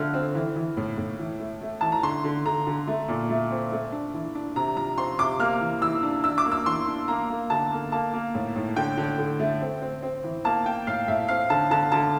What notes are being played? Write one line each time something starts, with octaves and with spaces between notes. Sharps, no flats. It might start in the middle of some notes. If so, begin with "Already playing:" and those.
Already playing: D3 F3 A3 F6
C4
E3
E3
A2
A2
E3
A3
A3
E3 A5
A#5
D3 C6
D3
D3 A#5
D3
A3
A#2
A3
C4
A3
D4
E3
D4
C3 A#5
F3 A#5
C4 C6
C3 D6
A#3 F6
E3
E3 E6
D4
D4 E6
D6
A#3
E6
E3 C6
D4
A#3 A#5
A#3
D3 A5
A#3
A#3 A5
A#3
A2
A2
D3 G5
D3
D3
A3
C4
C4
C4
E3
A#3 A5
A#3 G5
A2 F5
A2 E5
C4 F5
D3 A5
D3 A5
D3 A5